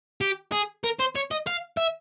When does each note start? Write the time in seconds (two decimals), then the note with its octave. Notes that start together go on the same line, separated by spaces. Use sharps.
0.21 G4
0.52 G#4
0.84 A#4
0.99 C5
1.15 C#5
1.31 D#5
1.47 F5
1.77 E5